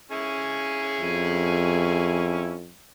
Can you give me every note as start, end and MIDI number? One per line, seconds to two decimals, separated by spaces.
0.12 2.57 61
0.12 2.57 64
0.12 2.57 68
1.01 2.73 41